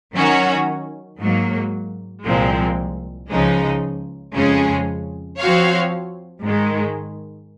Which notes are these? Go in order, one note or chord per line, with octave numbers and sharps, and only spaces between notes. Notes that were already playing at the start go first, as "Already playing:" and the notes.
D#3 F#3 C#4 F#4 C#5
G#2 F#3 A#3
C2 A#2 F3 G#3 C4
C#2 C#3 F3 G#3 D#4
F2 C#3 G#3 C#4 G#4
F3 C4 F#4 C#5 F5
G#2 D#3 G#3